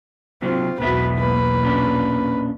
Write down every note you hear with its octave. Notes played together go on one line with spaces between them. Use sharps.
C3 F#3 C4 F4
B1 E2 G#2 B3 F#4 B4 E5
A#3 B4
A#2 C#4 D4